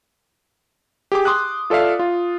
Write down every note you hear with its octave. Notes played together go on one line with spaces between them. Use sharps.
G4 G#4 D6
C6 D6 D#6 F#6
F4 A4 D5 E5 F5
F4